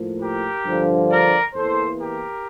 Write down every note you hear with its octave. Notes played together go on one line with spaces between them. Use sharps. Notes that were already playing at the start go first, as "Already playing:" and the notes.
Already playing: A2 F3 A#3
G4 A#4
G2 D3 F3 A#3
A#4 D5
E2 E3 A#3 A4 C5
G4 A#4